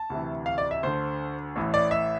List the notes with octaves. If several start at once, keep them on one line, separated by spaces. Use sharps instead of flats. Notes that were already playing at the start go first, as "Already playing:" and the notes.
Already playing: A5
D2 C3 E3
F5
D5
E5
D2 D3 C5
A1 A2 E3
D5
E5